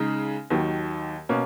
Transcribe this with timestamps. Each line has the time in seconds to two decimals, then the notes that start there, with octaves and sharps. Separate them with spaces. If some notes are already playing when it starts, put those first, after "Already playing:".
Already playing: C#3 G#3 D#4
0.50 D#2 D#3 F#3
1.29 B2 A#3 C#4